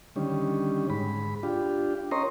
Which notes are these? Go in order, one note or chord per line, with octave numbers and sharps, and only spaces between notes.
D3 D#3 G3 C#4
G#2 B5
D4 F4 G4
C#4 A#4 C#5 D#5 A#5 C6